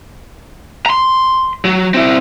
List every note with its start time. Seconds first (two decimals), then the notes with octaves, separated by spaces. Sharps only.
0.86 A#5 C6
1.65 F#3
1.94 C4 E4